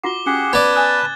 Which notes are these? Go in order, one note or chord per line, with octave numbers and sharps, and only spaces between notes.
F4 F#4 F#5 D6 G7
C#4 G4 G#4 F#5
B3 B4 D5 A5 G#6
C#5 G#5 D#6 F#6 A6